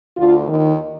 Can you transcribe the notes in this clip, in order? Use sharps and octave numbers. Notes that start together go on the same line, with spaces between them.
D2 D3 F4
D#2 D#3